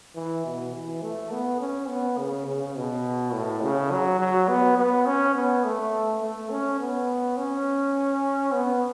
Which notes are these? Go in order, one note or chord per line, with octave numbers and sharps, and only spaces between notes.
E3
B2
E3
A3
B3
C#4
B3
C#3
C#3
B2
A2
C#3
F#3
F#3
B3
B3
C#4
B3
A3
A3
C#4
B3
C#4
B3